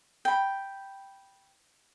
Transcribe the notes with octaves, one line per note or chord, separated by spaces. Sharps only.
G5 B5